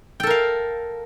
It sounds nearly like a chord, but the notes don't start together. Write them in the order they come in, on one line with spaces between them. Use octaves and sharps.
G5 A4 A#4 F5